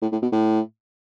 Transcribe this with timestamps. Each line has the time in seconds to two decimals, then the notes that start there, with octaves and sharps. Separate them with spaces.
0.02 A2
0.12 A2
0.22 B2
0.32 A2